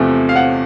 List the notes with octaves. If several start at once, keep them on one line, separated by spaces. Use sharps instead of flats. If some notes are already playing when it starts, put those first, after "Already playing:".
Already playing: E2 C3 F3 A3
F5
F#5